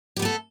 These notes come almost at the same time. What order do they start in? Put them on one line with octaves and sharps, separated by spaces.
G4 B3 A3 A4